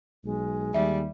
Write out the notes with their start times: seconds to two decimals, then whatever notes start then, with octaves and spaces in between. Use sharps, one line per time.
0.24 B1 G#3
0.74 D#2 G3 E5